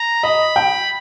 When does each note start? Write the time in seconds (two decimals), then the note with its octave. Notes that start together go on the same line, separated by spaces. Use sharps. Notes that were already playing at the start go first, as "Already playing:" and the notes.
Already playing: A#5
0.23 D#5 B5
0.56 G5